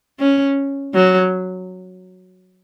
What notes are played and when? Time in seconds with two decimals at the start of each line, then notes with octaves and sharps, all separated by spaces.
0.19 C#4
0.94 F#3